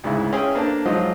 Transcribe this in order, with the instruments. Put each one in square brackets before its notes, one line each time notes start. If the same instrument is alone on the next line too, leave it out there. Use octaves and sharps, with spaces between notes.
[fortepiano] D2 G#2 C#3 E4
C#4 G#4 E5 F5 G5
A#3 D4 A4 C5 A5
G#2 F3 F#3 F4 C5 D#5